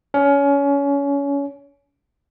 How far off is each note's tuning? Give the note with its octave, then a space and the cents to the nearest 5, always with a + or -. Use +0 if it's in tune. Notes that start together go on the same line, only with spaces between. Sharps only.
C#4 +25